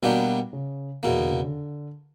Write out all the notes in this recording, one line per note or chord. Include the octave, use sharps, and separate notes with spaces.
B2 F#3 G3 A#3 B3 D4 G4
C#3
E2 B2 E3 A#3
D3
C#3
D3